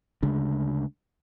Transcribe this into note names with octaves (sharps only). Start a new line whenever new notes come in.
D2 C#3 G#3 D4